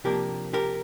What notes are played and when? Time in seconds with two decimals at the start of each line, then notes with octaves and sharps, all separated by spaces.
0.04 C3 F3 A#3 D4 G4 A#4
0.53 G4 A#4